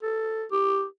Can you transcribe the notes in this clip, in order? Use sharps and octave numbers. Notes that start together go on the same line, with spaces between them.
A4
G4